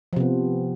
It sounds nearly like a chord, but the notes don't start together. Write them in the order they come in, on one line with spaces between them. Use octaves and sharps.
F3 C3 B3